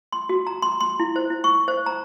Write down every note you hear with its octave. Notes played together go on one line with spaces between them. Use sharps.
C6
F#4
A#5
C6
C6
E4
C5
E4
C#6
C5
A#5